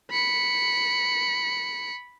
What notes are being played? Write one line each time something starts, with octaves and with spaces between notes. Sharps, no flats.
B5 C#7